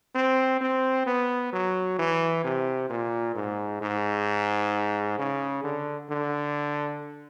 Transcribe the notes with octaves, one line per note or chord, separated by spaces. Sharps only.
C4
C4
B3
F#3
E3
C3
A#2
G#2
G#2
C#3
D3
D3